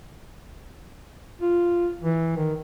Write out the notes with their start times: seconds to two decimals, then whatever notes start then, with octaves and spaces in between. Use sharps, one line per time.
1.41 F4
2.02 E3
2.37 D#3